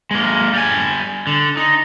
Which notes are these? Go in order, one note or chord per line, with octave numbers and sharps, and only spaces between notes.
G#3 A#3
G3 G#5
D3
D#4